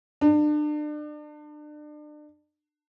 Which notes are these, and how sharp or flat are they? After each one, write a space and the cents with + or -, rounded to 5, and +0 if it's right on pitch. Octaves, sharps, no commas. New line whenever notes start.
D4 +35